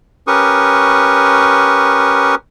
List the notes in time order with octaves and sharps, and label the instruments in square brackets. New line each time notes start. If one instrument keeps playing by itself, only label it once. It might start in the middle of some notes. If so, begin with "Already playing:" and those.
[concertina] C#4 G4 A#4 B4 C#6 D#6